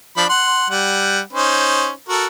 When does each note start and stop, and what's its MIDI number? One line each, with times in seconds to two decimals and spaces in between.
0.17 0.24 53
0.17 0.24 62
0.17 0.24 83
0.29 0.67 78
0.29 0.67 84
0.70 1.20 55
0.70 1.20 78
1.33 1.90 61
1.33 1.90 63
1.33 1.90 72
2.09 2.26 66
2.09 2.26 69
2.09 2.26 70